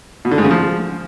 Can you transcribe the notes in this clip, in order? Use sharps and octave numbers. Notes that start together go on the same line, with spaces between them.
B2
D3
G#2
C#3
F3